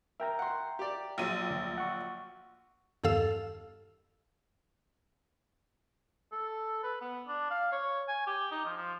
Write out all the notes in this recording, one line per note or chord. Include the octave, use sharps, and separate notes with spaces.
A#4 E5 G5 A#5
F#5 C6
G4 D5
A#1 F#3 D#7
D2
F#5 C#6
E2 G2 D#3 A4 F5 E6
A4
B4
B3
D4
F5
C#5
G#5
G4
D#4
F3
F3